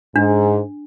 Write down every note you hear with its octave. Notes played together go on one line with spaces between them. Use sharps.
G#2 D4